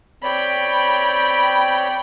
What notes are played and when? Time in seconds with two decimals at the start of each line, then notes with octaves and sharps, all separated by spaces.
0.23 C4 C#5 D5 G5 B5